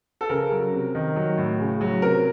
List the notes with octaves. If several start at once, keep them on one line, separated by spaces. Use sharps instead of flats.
A4
C#3 A#4
F#3
C3
D#3
F#3
A2
C#3
F#3
C3 A#4